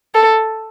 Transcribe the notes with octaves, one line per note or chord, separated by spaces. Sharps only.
A4